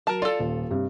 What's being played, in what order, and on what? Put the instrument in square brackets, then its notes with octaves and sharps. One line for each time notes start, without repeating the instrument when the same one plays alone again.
[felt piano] F#3 [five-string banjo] A#4 A5
[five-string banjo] F4 A4 [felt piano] D5
[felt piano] D#1
G2 C3